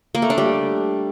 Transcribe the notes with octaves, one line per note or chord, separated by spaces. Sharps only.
A#3
A3
D4
G3